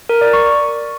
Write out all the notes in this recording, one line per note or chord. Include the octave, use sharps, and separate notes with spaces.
A#4
D5
C#6